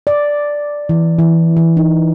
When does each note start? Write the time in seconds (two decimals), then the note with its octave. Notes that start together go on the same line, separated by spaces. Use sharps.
0.07 D5
0.89 E3
1.19 E3
1.57 E3
1.77 D#4